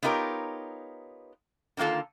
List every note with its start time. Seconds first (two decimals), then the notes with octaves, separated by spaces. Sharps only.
0.03 B3 D#4 F4 G4 A#4 C#5
1.77 D3 D#3 A#3 F4 A4